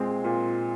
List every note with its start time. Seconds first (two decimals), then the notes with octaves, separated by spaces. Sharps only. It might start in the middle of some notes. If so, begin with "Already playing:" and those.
Already playing: A#2 G#3 C4
0.24 A#2